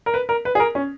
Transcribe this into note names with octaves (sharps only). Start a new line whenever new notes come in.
A#4
B4
A#4
B4
G#4
A#4
C#4